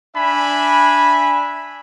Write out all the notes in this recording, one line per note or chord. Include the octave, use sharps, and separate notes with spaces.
D4 E5 G#5 B5